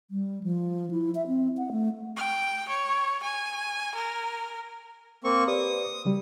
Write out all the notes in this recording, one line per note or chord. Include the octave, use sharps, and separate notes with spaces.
G3
F3
E4
E5
C4
F#5
A3
G5
C#5
G#5
A#4
A#3 C4 C#6
G4 B4 D5 D#6
C#3 F#3 G3